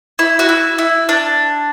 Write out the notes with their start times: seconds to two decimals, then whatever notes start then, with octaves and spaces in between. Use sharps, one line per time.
0.19 E4
0.39 F#4
0.49 E4
0.78 E4
1.09 D4